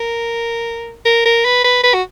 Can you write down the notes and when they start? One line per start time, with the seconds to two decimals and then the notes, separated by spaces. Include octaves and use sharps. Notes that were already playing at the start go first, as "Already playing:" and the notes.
Already playing: A#4
1.06 A#4
1.26 A#4
1.45 B4
1.64 B4
1.84 B4
1.94 F#4